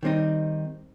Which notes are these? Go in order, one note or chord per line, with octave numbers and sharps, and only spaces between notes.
D#3 G3 C4 D#4